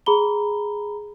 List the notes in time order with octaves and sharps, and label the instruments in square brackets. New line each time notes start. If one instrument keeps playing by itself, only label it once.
[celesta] G#4 A#5 B5 G7